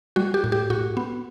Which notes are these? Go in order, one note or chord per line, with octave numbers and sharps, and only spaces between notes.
G3 F#4
G4
A2
G4
A2 F#4
B3